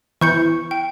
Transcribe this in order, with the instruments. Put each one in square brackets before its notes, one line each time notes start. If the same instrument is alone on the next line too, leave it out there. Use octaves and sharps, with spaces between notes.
[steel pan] E3 [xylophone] C#6 G6 C#7
[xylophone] G5